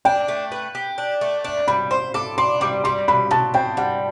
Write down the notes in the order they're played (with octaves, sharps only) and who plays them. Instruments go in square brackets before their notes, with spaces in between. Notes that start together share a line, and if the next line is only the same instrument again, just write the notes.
[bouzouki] D4 [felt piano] G5
[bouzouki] A3
B4
G4
D4
A3
D4
[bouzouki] G3 [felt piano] B5
[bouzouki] C5 [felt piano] C6
[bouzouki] A4 [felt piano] D6
[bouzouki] D4 [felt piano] C6
[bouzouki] G3 [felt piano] D6
[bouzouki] G3 [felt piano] C6
[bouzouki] B2 [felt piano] B5
[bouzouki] B2 [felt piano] A5
[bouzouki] C4 [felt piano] G5
[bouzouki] G3 [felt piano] F#5